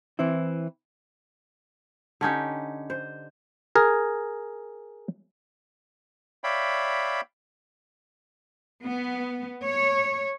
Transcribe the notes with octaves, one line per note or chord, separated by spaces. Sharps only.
E3 C4 E4
D3 C#4 D#4 G4
C5
G#4 A#4
C#5 D5 E5 F5 G5 B5
B3
C#5